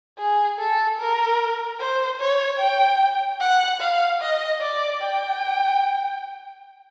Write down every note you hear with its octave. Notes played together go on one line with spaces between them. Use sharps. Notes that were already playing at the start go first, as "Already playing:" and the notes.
G#4
A4
A#4
C5
C#5
G5
F#5
F5
D#5
D5
G5